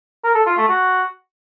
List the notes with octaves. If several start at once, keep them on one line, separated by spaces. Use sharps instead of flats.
A#4
A4
F4
A3
F#4